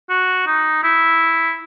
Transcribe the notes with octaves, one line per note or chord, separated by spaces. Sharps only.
F#4
D#4
E4